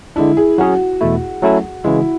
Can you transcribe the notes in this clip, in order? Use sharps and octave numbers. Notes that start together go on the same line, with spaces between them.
D3 G#3 D4 E4
G#4
F#3 C#4 F#4 G#4
E2 B2 A3 E4
F#3 A3 C#4 E4 A4
C#3 E3 G#3 E4